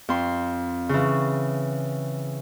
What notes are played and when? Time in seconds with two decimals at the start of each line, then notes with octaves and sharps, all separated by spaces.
0.09 F2 C6
0.89 C#3 E3